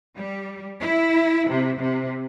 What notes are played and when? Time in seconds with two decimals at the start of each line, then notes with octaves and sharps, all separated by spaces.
0.16 G3
0.80 E4
1.49 C3
1.79 C3